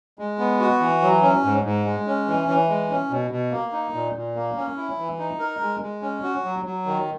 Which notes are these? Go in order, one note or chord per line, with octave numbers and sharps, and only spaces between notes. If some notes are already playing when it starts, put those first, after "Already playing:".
G#3
B3
F#4
E3
F#3
C#4
G#2
G#2
G#3
C#4
E3
E3
G#3
C#4
B2
B2
A#3
D#4
A#2
A#2
A#3
C#4
E4
E3
D#4
A#4
G#3
G#3
C#4
F#4
F#3
F#3
D#3